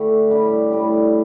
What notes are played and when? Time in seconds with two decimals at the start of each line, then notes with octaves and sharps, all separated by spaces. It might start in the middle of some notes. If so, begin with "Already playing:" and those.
Already playing: D3 A3 E4 G4 A4
0.29 A2 G3 D4 G4
0.70 A2 G3 D4 G4